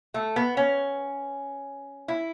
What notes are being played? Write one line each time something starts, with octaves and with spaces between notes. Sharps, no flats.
A3
B3
C#4
E4